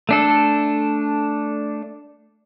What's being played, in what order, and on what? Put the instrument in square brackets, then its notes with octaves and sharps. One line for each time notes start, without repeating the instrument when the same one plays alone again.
[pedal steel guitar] A3 D4 A4